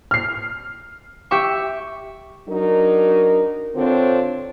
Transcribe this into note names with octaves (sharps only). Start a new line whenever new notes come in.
F6 C7
G4 E5 C#6
F#3 D4 D#4 A#4
D3 C4 D4 F4 C5 C#5